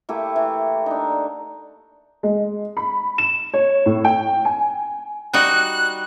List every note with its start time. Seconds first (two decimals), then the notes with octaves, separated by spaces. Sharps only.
0.09 A3 A#3 E4 G4
0.36 E3
0.86 D4 D#4
2.23 G#3
2.77 B5
3.18 E7
3.54 C#5
3.86 A2
4.05 G5
4.45 G#5
5.34 G3 D#4 F#4 F#6